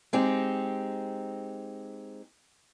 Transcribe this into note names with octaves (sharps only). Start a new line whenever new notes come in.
G#3 C4 D#4 G4